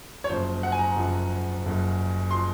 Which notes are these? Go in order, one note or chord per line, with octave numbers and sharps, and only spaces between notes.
C#5
F#1 F#2 F3 C5
F#5
G#5
A#5
F#1 F#2 F3
F#1 F#2 F3
F3 C6